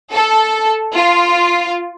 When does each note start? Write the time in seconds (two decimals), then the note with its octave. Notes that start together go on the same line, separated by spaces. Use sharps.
0.12 A4
0.94 F4